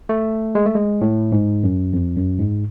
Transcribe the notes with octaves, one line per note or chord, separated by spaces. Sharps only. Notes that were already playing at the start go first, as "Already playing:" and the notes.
A3
G#3
A3
G#3
A2
G#2
F#2
F2
F#2
G#2